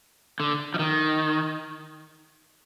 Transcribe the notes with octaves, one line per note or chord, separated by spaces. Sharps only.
D3
F3
D#3